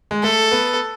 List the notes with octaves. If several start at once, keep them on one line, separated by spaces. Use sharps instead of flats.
G#3
A3 A4
B3